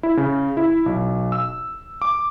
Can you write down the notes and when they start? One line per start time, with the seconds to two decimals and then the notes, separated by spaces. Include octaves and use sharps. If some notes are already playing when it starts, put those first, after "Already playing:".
0.03 E4
0.17 C#3
0.57 E4
0.86 B1
1.32 E6
2.02 D6